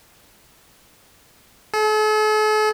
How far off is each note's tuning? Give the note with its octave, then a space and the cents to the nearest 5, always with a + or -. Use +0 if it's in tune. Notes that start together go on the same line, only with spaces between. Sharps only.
A4 -45